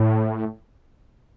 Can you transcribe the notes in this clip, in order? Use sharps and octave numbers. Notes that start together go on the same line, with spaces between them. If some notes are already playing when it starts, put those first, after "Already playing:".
Already playing: A2